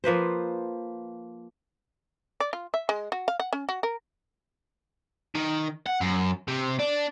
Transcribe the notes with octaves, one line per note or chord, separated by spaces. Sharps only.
F3 A#3 B4 C5
D5
F4
E5
G#3
F#4
F5
F#5
C#4
F#4
A#4
D#3
F#5
F#2
C3
D4